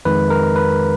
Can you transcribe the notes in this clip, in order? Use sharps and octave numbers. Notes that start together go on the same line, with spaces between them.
F2 D#3 G#3 D#4 B4
A#4
B4